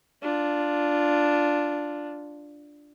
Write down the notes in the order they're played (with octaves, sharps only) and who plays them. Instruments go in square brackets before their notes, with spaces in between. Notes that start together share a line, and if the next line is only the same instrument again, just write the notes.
[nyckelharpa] D4 F4